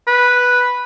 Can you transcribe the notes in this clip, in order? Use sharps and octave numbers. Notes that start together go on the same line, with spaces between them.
B4